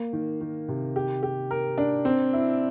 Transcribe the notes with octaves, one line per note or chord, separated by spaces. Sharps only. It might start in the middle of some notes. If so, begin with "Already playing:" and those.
Already playing: A#3
D#3
D#3
C3
G4
G4
A#4
D4
C4
E4